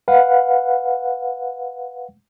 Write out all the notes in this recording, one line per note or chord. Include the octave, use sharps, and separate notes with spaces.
B4 F5 F#5